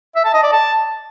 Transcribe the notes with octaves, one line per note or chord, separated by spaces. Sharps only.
E5
A5
D#5
D5
A5